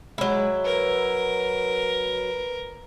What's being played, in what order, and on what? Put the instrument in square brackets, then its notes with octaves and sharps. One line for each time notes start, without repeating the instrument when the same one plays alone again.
[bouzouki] F#3 E4 [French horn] G#3
[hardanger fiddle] A#4 [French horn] B4